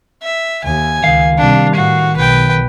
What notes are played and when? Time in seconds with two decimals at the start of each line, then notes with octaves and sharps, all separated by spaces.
0.23 E5
0.64 D#2 G#5
1.04 C#2 D#3 F5
1.38 C3 G3 D4
1.75 A2 F#4
2.17 B1 B4 G5